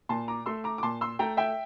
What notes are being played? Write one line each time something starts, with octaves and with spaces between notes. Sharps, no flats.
A#2 A5 C6
A#5 D6
A3 C6 E6
A#5 D6
D6
A#2 A5 C6
C6 E6
A3 G5 A#5
E5 G5